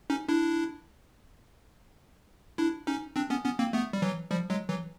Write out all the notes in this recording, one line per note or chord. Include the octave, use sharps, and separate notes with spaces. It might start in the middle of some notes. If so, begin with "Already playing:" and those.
C#4 D#4
D4 E4
D4 E4
C#4 D#4
C4 D4
B3 C#4
B3 C#4
A#3 C4
A3 B3
G3
E3 F#3
F3 G3
F#3 G#3
E3 F#3